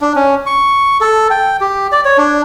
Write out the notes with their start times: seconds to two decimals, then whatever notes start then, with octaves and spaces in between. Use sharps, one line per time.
0.01 D4
0.16 C#4
0.46 C#6
1.01 A4
1.30 G5
1.61 G4
1.92 D5
2.05 C#5
2.18 D4